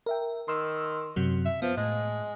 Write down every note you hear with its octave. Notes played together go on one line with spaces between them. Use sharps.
A#4 E5 G5
D#3 C6 E6
F#2 C3 F#3
E5
F3 B3
A2 G#3